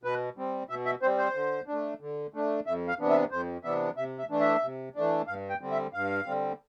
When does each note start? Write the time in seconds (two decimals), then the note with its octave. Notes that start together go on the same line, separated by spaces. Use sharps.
0.03 B2 B4
0.37 G3 C4
0.69 B2 E5
0.86 E5
1.02 G3 C4 C5
1.18 C5
1.34 D3
1.67 A3 D4
2.01 D3
2.34 A3 D4
2.66 F2 E5
2.88 F5
2.99 C3 E3 B3 D4
3.10 E5
3.31 F2 C5
3.64 C3 E3 B3 D4 E5
3.97 C3 E5
4.19 E5
4.29 E3 A3 D4
4.40 E5
4.63 C3
4.96 E3 A3 D4
5.28 G2 F5
5.50 G5
5.61 D3 G3 C4
5.71 E5
5.93 G2 F5
6.26 D3 G3 C4